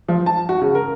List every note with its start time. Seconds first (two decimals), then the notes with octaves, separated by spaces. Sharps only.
0.08 F3
0.26 A5
0.49 F#4
0.61 C#3
0.75 A#4